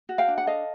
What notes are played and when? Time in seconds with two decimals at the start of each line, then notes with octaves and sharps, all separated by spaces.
0.09 F#4
0.18 F5 G5
0.28 D4
0.38 F#5
0.47 A4 D#5 F5